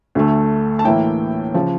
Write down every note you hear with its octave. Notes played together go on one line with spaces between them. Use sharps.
D2 D3 A3
A5
A2 E3 A#3 E5 G5
C#3 F3